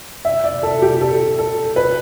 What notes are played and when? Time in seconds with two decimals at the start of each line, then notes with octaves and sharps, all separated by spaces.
0.25 E5
0.44 D5
0.63 A4
0.82 G4
1.01 A4
1.39 A4
1.76 B4